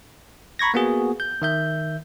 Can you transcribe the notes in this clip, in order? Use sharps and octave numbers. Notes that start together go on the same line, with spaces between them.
A#5 B5 C#6 G#6 A#6
A#3 B3 F#4 G#4
G6
D#3 E5 G6